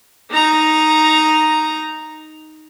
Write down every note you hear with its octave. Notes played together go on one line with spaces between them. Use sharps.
D#4 A#5